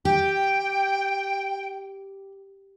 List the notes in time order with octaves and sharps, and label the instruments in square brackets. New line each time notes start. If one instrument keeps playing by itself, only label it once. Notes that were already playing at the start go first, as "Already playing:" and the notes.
[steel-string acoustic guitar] G4 [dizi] G5